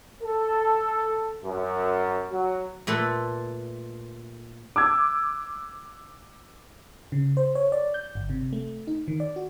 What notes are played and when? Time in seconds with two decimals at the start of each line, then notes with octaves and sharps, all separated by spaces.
0.22 A4
1.44 F#2
2.31 F#3
2.87 A#2 A3 A4 B4
4.76 D6 E6 G#6
7.12 C#3
7.37 C5
7.55 C#5
7.72 D5
7.94 G6
8.15 G1
8.30 C3
8.53 A3
8.87 D#4
9.08 D#3
9.20 D5
9.36 F#4